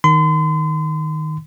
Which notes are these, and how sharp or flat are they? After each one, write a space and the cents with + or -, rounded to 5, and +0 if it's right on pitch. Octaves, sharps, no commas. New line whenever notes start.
D#3 +0 C6 -40